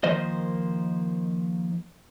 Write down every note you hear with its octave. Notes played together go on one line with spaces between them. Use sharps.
D#3 F3 A#3 C5 D#5